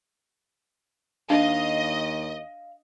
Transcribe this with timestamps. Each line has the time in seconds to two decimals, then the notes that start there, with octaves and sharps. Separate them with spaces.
1.30 D#2 D4 D#5 F5